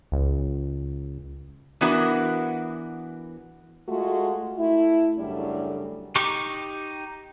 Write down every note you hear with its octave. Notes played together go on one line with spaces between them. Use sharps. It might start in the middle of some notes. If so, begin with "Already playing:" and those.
C#2
E3 B3 D4 F#4 A#4
G#3 A3 F4 F#4
A3 E4
F#2 C#3 G3 A3 D4
D#4 G4 C#6 D6